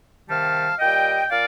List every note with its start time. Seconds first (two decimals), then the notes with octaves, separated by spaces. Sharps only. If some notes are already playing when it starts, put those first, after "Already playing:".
0.28 C3 D#3 G3 F5 A5
0.79 A#2 G3 D#5 G5
1.30 A#2 D5 F5